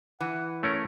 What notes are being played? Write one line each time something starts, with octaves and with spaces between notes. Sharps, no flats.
E3 F#5
A3 C#4 A#4 C#5